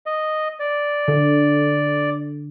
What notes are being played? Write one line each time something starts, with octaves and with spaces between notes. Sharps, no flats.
D#5
D5
D3